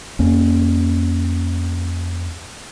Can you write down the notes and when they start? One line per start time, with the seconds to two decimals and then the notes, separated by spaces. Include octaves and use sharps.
0.19 F2 A#3 C#4